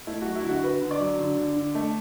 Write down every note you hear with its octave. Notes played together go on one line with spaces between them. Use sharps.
A3 E4
F#3 F#4
E4
D3 F#4
D3 B4
D3
D5
F#3
D3
D3
D3
A3